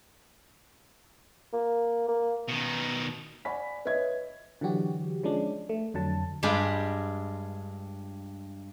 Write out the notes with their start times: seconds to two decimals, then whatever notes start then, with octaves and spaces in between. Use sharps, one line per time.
1.53 A#3
2.08 A#3
2.48 B2 D#3
3.45 D5 F#5 G#5 B5 B6
3.85 B4 C#5 D#5 E5 G#6
4.61 D3 E3 F#3 F#4 G4
5.23 F3 G#3 C#4 D4
5.69 A3
5.94 F2 D3 F#3 A5
6.43 G2 G#3 F4 G4 G#4 B5